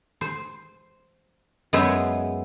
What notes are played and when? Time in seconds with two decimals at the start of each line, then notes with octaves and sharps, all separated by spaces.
0.21 C5
1.73 F#2 G#3 B3 C5 E5 G#5